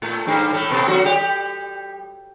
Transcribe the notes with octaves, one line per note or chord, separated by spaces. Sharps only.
A2 A3
G2 G3
A2 A3
B2 B3
F#3 F#4
G3 G4